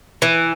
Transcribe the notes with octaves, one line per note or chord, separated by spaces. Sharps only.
E3